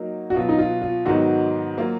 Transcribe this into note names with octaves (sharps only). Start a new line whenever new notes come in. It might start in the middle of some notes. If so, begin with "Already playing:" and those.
Already playing: F#3 A#3 D#4 F#4 A#4
F#4
B2 F#3 B3 F4
D#4
F4
F4
G#2 D#3 F#3 B3 D#4 F#4
F#3 A#3 F4